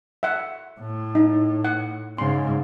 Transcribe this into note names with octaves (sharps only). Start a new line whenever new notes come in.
E5 F#5
A2
D#4
F#5
G#2 C#3 C6